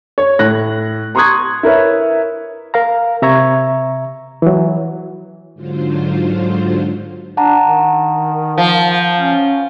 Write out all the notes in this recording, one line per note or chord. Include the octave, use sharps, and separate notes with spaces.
C#5
A2 F#6 A#6
A#5 C6 C#6 D#6 F#6 G#6
E4 A#4 B4 C#5 E5
A#4 F5 A#5
C3 E5 A#5 C#6 G#6
E3 F#3
G#2 D3 F#3 F4 C5
D4 F#5 A5 A#5
D#3
F3
C#4